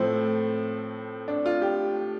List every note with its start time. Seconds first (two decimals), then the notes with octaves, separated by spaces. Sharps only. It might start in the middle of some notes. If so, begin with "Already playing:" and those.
Already playing: A2 F3 A3 C4
1.28 D4
1.46 F4
1.62 G4